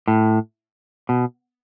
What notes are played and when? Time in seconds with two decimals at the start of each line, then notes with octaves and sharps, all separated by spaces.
0.08 A2
1.09 B2